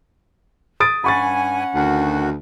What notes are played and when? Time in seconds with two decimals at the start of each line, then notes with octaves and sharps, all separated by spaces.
0.80 D#6 A6 D7
1.04 G2 C#4 F#5 G#5 B5 C#6 A6
1.75 D2 D#3 F#4